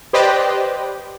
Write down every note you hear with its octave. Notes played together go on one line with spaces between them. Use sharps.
G4 B4 C5 D5 D#5 G5